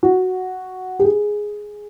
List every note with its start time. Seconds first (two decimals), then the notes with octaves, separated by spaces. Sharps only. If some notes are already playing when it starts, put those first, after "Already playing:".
0.03 F#4
0.99 G4
1.04 G#4